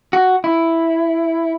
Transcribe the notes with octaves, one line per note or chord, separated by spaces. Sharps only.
F#4
E4